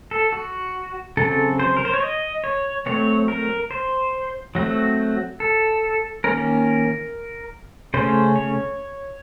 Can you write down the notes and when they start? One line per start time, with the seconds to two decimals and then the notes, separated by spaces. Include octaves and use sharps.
0.11 A4
0.32 F#4
1.17 C#3 F#3 C4 A4
1.60 C5
1.77 A#4
1.85 C5
1.94 C#5
2.02 D#5
2.44 C#5
2.86 F#3 A3 C4 C#5
3.28 A#4
3.71 C5
4.55 F#3 A3 C4 F#4
5.40 A4
6.24 D#3 A#3 C#4 A#4
7.94 C#3 A3 C#4 C5
8.36 C#5